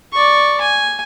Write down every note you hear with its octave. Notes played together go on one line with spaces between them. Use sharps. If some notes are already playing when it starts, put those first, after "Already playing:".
D5 C#6
G#5